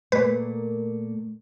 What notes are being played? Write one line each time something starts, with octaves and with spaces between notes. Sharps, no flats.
A#2 A3 A#3 B4